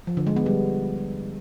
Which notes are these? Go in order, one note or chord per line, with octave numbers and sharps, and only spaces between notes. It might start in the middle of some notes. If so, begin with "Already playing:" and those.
F3
D3
G#3
B3
G3